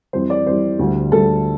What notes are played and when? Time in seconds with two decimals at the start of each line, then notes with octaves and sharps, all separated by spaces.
0.13 F2 E3 G3 C5
0.30 D5
0.46 F2 E3 G3 C5
0.79 D2 D3 G3
1.12 D2 D3 G3 A4